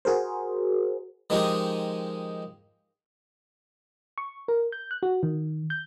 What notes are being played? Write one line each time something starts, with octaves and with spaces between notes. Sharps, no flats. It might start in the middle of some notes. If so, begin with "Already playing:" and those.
F#4 G#4 A#4 C5
D#3 F3 G#3 D#4 G4 G#4
C#6
A#4
G6
F#6
F#4
D#3
G6